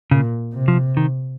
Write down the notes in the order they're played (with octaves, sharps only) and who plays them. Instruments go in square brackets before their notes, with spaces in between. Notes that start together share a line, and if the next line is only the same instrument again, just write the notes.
[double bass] A#2 [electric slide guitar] C#3
[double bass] C3
[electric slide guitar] F3
D#3